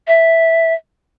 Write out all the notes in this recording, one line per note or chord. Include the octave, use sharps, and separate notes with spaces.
E5